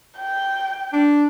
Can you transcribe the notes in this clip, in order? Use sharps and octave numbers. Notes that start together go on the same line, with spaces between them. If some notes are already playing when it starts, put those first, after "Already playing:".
G5
D4